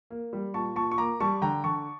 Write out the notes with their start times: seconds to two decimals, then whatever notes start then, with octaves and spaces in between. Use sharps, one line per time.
0.10 A#3
0.33 G3
0.54 A#2 A5 C#6
0.76 A#2 A5 C#6
0.91 C#6
0.98 A#3 A#5 D6
1.20 G3 A5 C#6
1.42 D3 G5 A#5
1.64 D3 A5 C#6